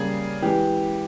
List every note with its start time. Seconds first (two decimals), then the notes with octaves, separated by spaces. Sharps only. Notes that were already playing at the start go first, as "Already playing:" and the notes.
Already playing: C#3 G3 A#3 G#4
0.42 E3 G#3 G4